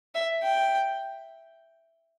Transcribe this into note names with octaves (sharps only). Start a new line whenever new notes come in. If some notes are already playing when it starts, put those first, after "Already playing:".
E5
G5